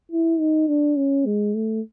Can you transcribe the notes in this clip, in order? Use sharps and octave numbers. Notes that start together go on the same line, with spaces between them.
E4
D#4
D4
C#4
G#3
A3